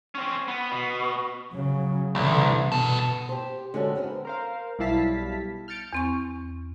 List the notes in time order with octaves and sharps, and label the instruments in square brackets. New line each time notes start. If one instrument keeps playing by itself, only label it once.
[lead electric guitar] C4 C#4
B3
B2
[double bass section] C#3 F#3
[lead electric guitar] C2 [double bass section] D3 E3
[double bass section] B2 [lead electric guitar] B3 A4
[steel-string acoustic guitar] G4 C5
D3 G#3 C#4 F#4 G#4 A4
B3 C4 E4 A#4
[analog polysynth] A#4 C5 F5
B1 G3 E4 F5 A5 B6
F6 G6 A6 C#7 D7
[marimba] E2 C4 C#6